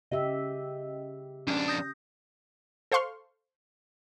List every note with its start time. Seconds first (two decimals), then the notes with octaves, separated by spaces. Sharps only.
0.12 C#3 G4 D#5 E5
1.47 F2 C#4 D4
1.68 D#6 G6 A#6
2.92 A4 C5 F5 C6 C#6 F6